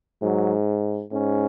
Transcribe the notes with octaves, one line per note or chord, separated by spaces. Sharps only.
G#2 F#3
G#2 C#4